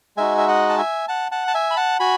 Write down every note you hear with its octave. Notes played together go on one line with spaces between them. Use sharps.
G#3 D#4 F#4 E5 G#5
E5
D#5 F#5
A5
E5 G#5
F#5 A5
F#5 A5
A5
E5 G#5
B5
F#5 A5
F#4 G#5 B5